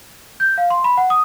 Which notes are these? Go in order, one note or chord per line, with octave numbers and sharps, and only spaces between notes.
G6
F5
C6
B5
F#5
D#6